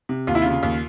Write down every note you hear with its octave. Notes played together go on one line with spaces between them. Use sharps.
C3
D#2 F4
E4
C#3 F4
D#2